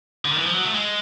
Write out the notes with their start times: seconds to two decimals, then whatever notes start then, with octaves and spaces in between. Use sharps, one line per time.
0.25 D3
0.32 D#3
0.38 E3
0.46 F3
0.54 F#3
0.65 A3
0.74 G#3